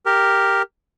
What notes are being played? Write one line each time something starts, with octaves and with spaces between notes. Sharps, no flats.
G4 A#4